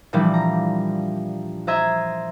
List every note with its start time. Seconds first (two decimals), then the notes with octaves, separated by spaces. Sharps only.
0.13 A#2 E3 F3 G3 D4
0.34 A#5
1.67 C5 D#5 E5 A#5 G#6